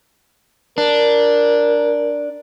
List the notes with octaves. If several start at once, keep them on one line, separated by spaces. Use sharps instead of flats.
D4 A#4